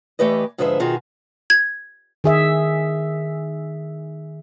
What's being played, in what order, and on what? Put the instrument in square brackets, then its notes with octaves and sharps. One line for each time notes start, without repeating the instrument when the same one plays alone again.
[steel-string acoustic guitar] E3 A3 G4 B4 D#5
G#2 D3 F3 G#4 B4 E5
B2 D#3 F4 F#4 G#4
[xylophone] G#6
[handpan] D#3 G#4 E5